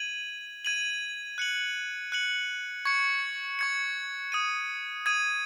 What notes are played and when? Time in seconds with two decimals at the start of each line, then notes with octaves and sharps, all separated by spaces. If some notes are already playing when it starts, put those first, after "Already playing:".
Already playing: G#6 D#7 F#7
0.65 G#6 D#7 F#7
1.38 F#6 C#7 F#7
2.12 F#6 C#7 F#7
2.85 C#6 G#6 C#7
3.59 C#6 G#6 C#7
4.32 D#6 G#6 D#7
5.06 D#6 G#6 D#7